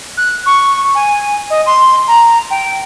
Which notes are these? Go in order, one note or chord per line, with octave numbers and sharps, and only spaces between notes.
F#6
C#6
G#5
D#5
C6
A#5
G5